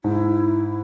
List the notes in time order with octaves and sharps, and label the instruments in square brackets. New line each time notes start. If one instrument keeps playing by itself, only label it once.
[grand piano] G#2 [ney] E4